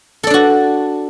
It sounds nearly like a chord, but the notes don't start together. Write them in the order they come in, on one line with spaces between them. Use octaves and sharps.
A4 D5 D4 F#4